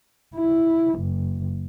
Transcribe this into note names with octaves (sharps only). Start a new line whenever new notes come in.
E4
F#1